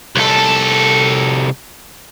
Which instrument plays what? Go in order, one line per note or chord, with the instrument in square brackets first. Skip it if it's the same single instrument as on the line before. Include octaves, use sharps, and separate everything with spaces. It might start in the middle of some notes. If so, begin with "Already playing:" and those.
[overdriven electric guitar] C2 A4